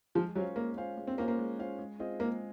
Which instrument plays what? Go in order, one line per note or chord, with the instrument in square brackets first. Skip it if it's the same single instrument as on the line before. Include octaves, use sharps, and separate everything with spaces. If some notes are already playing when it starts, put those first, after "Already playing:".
[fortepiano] F3 [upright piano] G#3
[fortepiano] F#3 [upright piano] C#4 F4 C5 F5
[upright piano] G#3 [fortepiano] A#3
[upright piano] C#4 F4 C5 F5
G#3
[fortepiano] C4
[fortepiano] A#3 [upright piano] C#4 F4 C5 F5
[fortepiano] A#3
[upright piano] G#3
C#4 F4 C5 F5
G#3
C4 F4 G#4 D#5
[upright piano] G#3 [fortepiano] A#3